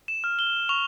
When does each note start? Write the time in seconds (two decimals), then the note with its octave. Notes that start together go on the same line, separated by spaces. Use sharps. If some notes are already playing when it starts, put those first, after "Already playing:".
0.08 E7
0.24 F6
0.39 G7
0.69 C#6 F7